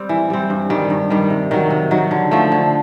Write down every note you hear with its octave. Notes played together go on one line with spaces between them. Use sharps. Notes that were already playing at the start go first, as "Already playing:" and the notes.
Already playing: G3 C4
E3
G3 C4
G2
D#3 G3
G2
D#3 G3
C3
D#3 F#3
C3
D#3 F#3
D3
F3 A3
D3